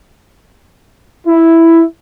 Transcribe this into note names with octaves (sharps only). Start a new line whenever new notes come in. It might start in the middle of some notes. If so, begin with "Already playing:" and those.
E4